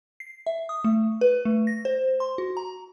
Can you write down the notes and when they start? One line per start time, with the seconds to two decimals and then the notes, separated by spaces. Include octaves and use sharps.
0.20 C7
0.46 E5
0.69 D#6
0.84 A3
1.21 B4
1.45 A3
1.67 A#6
1.85 C5
2.20 C6
2.38 F#4
2.57 A#5